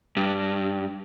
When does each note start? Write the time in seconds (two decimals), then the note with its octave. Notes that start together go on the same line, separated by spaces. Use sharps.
0.17 G2